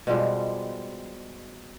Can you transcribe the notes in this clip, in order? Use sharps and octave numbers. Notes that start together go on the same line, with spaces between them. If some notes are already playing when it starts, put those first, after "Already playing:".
B2 F3 G3 G#3